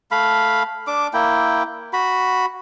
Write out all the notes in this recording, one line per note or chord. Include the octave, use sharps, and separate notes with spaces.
A3 F5 B5
D4 D6
A#3 E4 G5
F#4 B5